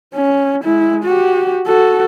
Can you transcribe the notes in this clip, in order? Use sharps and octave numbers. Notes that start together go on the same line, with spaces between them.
C#4
G#3 E4
F#4 G4
F#4 A4